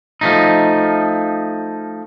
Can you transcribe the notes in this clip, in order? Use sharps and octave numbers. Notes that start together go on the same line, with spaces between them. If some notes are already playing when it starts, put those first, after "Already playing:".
F3 A3 D#4